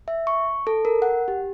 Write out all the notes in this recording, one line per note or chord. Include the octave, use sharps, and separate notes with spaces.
E5
C#6
A4
A#4
F#5
G4